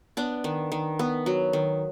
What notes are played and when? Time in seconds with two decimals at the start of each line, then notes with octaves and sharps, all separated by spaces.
0.17 B3 D4
0.44 D#3
0.72 D#3
0.99 B3
1.26 F#3
1.53 D#3